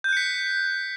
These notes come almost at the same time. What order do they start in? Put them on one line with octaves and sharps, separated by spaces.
G6 F#6 C#7 B6